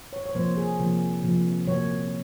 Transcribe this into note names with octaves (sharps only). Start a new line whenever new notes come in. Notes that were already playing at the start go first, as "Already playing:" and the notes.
C#5
C#5
C3 F3 A#3 C5
G#4
C3 F3 A#3
C3 F3 A#3
C3 F#3 A#3 C#5